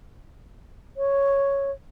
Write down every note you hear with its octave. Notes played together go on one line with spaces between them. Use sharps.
C#5